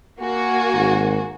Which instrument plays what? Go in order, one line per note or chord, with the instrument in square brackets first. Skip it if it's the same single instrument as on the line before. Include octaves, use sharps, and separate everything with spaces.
[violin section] A#3 F#4 [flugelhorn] G#5
[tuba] G#1